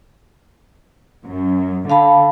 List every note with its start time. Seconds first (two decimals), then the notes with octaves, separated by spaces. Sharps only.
1.26 F#2
1.90 D3 F5 A5 B5